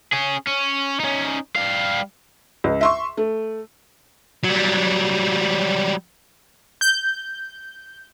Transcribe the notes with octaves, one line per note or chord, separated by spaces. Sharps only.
C#4 G#4
C#4
C#4 D#4
G3 F5
C#2
E5 C6 C#6
A3
F#3 G3
G6